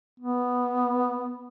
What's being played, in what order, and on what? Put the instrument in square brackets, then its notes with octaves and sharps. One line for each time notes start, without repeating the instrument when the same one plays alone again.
[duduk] B3